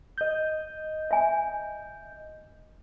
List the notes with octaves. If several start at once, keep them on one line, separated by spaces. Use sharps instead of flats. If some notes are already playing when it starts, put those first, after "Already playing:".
D#5 G6
E5 G#5